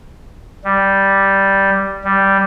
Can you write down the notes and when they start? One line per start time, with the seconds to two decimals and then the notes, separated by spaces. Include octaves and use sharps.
0.64 G3
2.04 G3